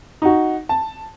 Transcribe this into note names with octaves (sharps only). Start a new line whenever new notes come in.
D#4 F#4
A5